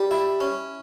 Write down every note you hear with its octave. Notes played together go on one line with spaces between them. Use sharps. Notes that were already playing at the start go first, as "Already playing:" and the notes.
Already playing: G3
E4
C#4